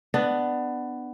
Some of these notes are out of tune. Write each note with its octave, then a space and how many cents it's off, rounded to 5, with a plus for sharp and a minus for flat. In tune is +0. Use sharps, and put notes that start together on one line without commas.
B3 +10 D4 +15